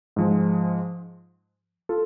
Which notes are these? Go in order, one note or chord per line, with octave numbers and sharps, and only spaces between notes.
G#2 F3 G#3
F4 A4